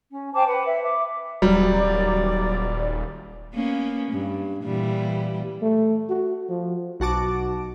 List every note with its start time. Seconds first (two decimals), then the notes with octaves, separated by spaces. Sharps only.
0.10 C#4
0.34 C5 G5 A5 D6
0.46 B4 F#5
0.65 E5
0.82 E5 D6
1.42 D#1 F#3 G3 D5
3.54 A#3 B3 C#4
4.12 G2
4.63 A#2 E3 G3
5.62 A3
6.09 F#4
6.49 F3
7.00 B1 F#4 A5 D6